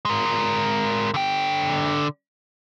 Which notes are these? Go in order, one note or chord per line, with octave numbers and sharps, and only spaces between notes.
G#3 A#4
D3 G5